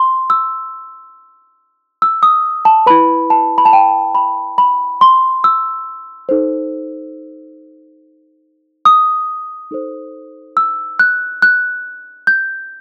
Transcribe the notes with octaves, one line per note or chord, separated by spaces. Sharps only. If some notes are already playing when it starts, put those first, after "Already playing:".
Already playing: C6
E6
E6
D#6
A5
E4 B4 B5
A5
B5
A5
G5
B5
B5
C6
E6
D#4 A4 C5
D#6
D#4 A4 C5
E6
F#6
F#6
G6